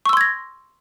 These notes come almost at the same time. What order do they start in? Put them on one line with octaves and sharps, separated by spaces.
C#6 E6 C6 G#6 A#6